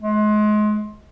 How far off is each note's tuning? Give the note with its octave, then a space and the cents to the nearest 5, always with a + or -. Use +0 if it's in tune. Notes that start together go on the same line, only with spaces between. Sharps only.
G#3 +30